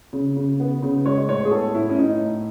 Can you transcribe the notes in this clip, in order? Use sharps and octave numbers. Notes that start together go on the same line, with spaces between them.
C#3
C#3
B3
C#3
G#3 C#5
A2 C#5
G#4
B3 A4
A2 E4
C#4
A2 D#4
A2